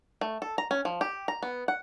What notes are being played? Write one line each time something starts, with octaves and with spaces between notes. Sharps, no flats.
A3
A4
A#5
C#4
F3
G4
A#5
B3
F#5